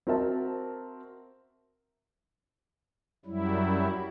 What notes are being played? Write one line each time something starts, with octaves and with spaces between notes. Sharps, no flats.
C4 F#4 A#4 D#5 E5 A5
F#2 F#3 G3 E4